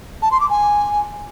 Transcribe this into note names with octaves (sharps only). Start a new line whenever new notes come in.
A5
C6
D6
G#5